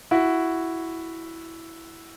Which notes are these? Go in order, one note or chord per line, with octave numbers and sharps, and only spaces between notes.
E4 F#4